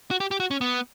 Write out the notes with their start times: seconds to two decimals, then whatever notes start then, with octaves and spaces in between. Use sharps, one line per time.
0.11 F#4
0.20 G4
0.31 G4
0.40 F#4
0.51 C#4
0.61 B3